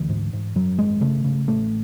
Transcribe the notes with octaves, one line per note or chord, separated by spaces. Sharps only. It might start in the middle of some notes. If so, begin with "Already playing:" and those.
Already playing: D2 E3
G#2
G#2
F#2 F#3
G#1 G#3
C#3 A3
C#3
A1 A3